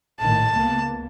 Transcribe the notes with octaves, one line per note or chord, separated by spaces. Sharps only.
A#1 A2 D#3 A5
C#2 A#3 B3